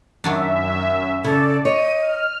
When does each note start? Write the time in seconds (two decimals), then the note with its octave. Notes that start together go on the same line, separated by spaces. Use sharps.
0.24 F#2 D#3 F#3 D4 E5
1.24 C#3 E4 A4 D5
1.65 C#5 D#5 D#7
2.02 F6